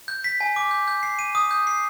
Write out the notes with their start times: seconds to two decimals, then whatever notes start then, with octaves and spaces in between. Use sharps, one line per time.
0.08 G6
0.24 B6
0.40 G#5
0.56 D6
0.71 G6
0.88 G6
1.03 C7
1.19 D#7
1.35 D#6
1.51 G6
1.67 C7